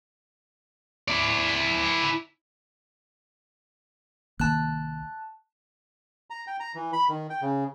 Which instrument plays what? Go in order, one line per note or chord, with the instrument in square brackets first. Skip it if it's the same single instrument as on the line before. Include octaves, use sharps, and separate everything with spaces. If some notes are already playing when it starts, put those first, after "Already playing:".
[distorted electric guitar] E4 D5
[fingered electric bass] C2 D#3 A#3 [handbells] A5 F#6
[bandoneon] A#5
G5
A#5
E3
B5
D#3
G5
C#3